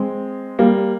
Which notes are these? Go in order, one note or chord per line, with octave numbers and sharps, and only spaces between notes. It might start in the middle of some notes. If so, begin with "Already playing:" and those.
Already playing: G#3 C4
G3 A#3